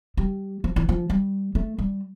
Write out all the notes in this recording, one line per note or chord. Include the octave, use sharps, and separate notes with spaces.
G3
F3
E3
F3
G3
A3
G3